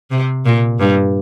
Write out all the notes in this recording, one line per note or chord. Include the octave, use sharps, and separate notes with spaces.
C3
A#2
G2